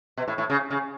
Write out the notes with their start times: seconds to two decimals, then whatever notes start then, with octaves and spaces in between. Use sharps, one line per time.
0.17 B2
0.28 A2
0.38 A2
0.50 C#3
0.71 C#3